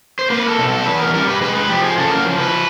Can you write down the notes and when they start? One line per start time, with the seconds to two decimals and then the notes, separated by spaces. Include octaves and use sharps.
0.19 C5
0.30 A#3 B4
0.48 A4
0.58 B2
0.68 A4
0.86 E2 B4
1.00 A#4
1.14 G3 A#4
1.28 B4
1.41 G#3 B4
1.55 B4
1.69 F3 G4
1.84 G#4
1.98 C#3 A4
2.11 A#4
2.25 F3
2.39 B4